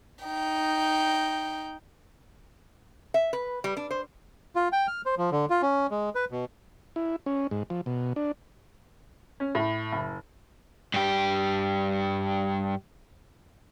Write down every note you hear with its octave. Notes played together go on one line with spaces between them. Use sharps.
D#4 G5
E5
B4
G3
D4
C5
F4
G5
F6
C5
F3
D3
F4
C#4
G#3
B4
B2
E4
C#4
G#2
F3
B2
D4
C#4
A2
F#1
G2 G4